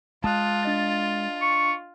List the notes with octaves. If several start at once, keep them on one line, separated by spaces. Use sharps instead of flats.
G#3 F4 A5 D#6 F#6
D4 D#5 A6
C#6